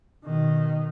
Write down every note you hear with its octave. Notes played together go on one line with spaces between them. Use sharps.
B2 D#3